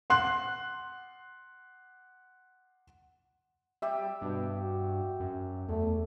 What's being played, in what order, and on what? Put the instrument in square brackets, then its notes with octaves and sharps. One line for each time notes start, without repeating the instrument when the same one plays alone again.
[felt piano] F#5 C6 F#6
[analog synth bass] G3 [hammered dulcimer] G4 E5
[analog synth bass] G2 [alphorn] B2
[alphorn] F#4
[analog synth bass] F#2
[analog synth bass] E2 [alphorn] A3